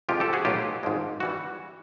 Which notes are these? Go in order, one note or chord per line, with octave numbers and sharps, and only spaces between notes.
F2 C3 F3 G#3 F4 G4
G4 A4
F#4 G#4
B1 A2 F#3 F4 G4
G#1 G#2 F3 G#3
E3 G3 F#4